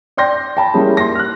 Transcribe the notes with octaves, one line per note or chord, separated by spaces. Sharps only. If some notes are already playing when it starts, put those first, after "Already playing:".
D5 G5 C6 G6 A#6
G5 A5 B5
G3 A#3 C#4 E4 G#4
C6 A#6
F6 F#6